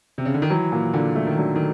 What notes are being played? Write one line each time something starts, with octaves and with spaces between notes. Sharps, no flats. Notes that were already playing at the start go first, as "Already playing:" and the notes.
C3
C#3
D3
D#3
E3 F#3
A#2
A#2 D3
A3
D#3
D3 F#3
D#3